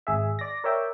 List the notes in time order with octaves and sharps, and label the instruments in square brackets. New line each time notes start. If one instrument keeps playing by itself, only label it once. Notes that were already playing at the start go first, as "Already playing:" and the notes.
[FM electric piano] G#1 G#4 E5
D5 A#6
A#4 C#5 D5 E5 G5